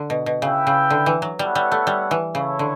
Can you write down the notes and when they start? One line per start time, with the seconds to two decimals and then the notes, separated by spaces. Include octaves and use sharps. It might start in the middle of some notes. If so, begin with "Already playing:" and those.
Already playing: D3
0.10 B2
0.26 B2
0.42 C#3 E4 B4 E5 G5
0.67 C#3
0.90 D3
1.06 E3
1.22 F#3
1.39 G3 B3 E4 A4 C#5 F#5
1.55 G3
1.72 A3
1.87 G3
2.11 E3
2.35 C#3 E4 A4 C#5
2.59 D3